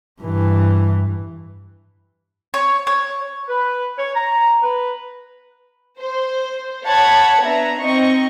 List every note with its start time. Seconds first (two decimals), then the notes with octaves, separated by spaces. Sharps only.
0.22 G2 E3
2.54 C#5
2.87 C#5
3.48 B4
3.97 C#5
4.15 A#5
4.62 B4
6.00 C5
6.86 C#5 F#5 A5 B5 G#6
7.44 B3 D4 E5 A#5
7.80 C4 D#4 D#5 C#6